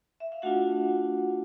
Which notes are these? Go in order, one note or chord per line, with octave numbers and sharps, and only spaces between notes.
E5
F5
A3 D4 F4 F#4 F#5